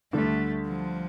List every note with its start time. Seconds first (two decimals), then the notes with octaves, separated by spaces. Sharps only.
0.13 D2 D3 G3 A3 D4 A4
0.64 F3